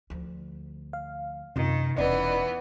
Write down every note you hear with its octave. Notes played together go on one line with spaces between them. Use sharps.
D2 F3
F5
F#2 C3 D#3 F4
E1 E3 B3 C#4 D#4 D5 D#5